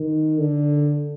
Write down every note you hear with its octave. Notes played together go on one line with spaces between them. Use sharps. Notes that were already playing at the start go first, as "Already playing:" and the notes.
Already playing: D#3
D3